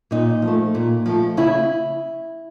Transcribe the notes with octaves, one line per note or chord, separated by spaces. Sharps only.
A#2 D#4
F3
A3
A#2
F3 A3
C#3 E4